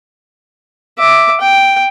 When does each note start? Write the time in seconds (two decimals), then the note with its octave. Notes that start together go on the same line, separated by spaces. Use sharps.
0.99 E5 D6
1.41 G5